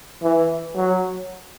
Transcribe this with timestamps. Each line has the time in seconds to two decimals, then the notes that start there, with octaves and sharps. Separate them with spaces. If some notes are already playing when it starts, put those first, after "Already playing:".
0.23 E3
0.76 F#3